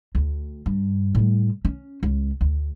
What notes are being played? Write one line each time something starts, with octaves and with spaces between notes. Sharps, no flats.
D2
G2
A2 G3
C#4
C#2
D2